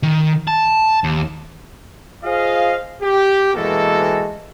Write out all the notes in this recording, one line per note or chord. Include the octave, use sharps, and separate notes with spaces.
D#3
A5
D#2
F4 G#4 C5 D#5 F5
G4
B2 E3 G#3 A#3 F#4 A4